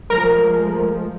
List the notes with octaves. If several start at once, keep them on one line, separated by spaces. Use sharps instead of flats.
F3 G#3 A3 A#4